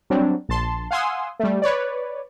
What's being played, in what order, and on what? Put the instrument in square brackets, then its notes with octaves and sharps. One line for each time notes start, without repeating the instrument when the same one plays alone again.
[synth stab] F#3 G3 C4 D4
A#1 A5 C6
F5 F#5 G#5 C6 D#6 E6
G3 A3
B4 C#5 D5